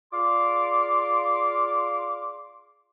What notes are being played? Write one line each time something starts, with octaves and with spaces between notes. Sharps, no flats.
F4 G#4 D5 F5 C6 D6